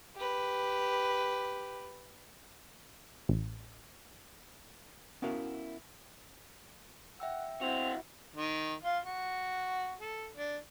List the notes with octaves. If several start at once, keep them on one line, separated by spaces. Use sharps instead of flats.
G4 B4
A1
B3 C#4 E4 F#4 A#4 F5
E5 F#5 G5 E6
C4 E4 F#4 F7
D#3
F4
F#4
A4
D4